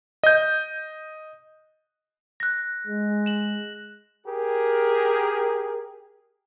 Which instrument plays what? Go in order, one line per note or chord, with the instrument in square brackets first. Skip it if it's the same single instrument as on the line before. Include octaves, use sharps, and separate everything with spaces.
[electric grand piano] D#5 G6
[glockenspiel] F#6 A#6
[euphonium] G#3
[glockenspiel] E7 F#7
[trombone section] G4 G#4 A#4